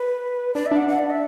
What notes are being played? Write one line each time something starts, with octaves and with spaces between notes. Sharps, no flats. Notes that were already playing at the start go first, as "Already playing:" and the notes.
Already playing: B4
D4 D5
E5
D4 F#5
F#5
D5
E5